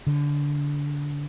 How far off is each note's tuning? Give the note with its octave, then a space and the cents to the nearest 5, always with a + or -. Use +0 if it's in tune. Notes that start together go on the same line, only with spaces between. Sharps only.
D3 -20